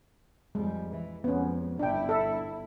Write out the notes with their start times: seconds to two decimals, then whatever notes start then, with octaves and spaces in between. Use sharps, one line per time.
0.55 F2 G3 G#3
0.90 E3
1.24 F2 G#3 B3 C#4
1.79 G1 D4 E4 G5
2.09 A4 E5